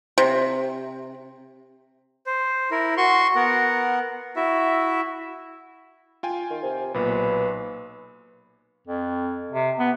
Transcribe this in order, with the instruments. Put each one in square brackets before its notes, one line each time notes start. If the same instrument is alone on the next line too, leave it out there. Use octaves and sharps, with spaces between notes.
[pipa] C3
[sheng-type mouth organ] C5
E4 A#4
F#4 C6 C#6
B3 A#4 F#5
E4 F#4 E5
[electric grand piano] F4 G5 G#5
[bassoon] D#3
C3
[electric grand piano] B1 A#2 [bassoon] B4
[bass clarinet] F2
C3
B3